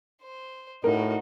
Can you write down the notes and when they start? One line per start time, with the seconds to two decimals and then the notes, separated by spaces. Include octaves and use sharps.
0.23 C5
0.84 A2 D#4 F#4 A#4